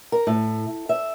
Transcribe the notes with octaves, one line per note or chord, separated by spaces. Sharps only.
A#4
A2
E5